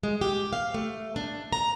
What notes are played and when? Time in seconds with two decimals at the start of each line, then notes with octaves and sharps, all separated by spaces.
0.03 G#3
0.21 G4
0.53 F5
0.74 A3
1.16 D4
1.53 A#5